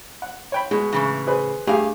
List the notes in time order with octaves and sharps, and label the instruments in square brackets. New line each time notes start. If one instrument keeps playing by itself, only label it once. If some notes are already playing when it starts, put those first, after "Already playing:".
[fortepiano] F#5
C#5 G5 B5
[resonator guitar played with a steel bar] B2 [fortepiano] G#3
[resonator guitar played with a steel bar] A2 C#3 E3
[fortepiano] G#4 B4 C5
[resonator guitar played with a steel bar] G2 F5 [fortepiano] A3 G4 G#4